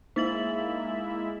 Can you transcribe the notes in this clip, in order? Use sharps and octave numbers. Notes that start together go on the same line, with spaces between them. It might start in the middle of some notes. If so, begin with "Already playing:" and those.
G#3 A#3 D#4 E4 E5 A6 F#7